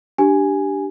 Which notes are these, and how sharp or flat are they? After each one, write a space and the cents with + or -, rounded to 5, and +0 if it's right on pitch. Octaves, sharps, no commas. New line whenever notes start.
D4 +0 G4 -10 G#5 +0